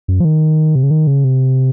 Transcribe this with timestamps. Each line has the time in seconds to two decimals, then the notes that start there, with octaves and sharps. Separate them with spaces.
0.08 F#2
0.20 F3
0.25 D#3
0.75 C3
0.83 C#3
0.91 D#3
1.07 C#3
1.24 C3